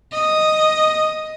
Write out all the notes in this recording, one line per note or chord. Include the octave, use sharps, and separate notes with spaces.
D#5